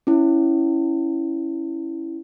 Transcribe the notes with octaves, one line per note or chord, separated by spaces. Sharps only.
C#4 E4